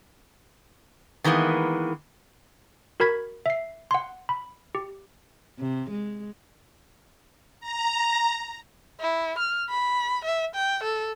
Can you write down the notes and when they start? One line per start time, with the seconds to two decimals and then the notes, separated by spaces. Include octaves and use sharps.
1.24 D#3 E3 G#3 A#3 B3
3.00 F#4 A#4 B5 G#6 B6
3.46 E5 C7
3.91 F#5 C6
4.29 B5
4.75 G4
5.59 C3
5.91 G#3
7.60 A#5
9.01 E4
9.38 F6
9.70 B5
10.25 E5
10.55 G5
10.84 A4